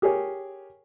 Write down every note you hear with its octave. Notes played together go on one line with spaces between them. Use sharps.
G4 G#4 A#4 C#5